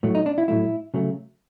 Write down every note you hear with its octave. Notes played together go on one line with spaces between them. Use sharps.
A2 F#3 A3
D#4
D4
E4
A2 F#3 A3 E4
C#3 F#3 A3